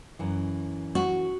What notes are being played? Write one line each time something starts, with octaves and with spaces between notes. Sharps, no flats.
F#2 E3
F#4